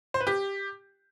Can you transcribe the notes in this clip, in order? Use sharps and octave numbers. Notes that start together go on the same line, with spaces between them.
C5
B4
G4